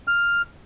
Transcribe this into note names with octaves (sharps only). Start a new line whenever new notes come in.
F6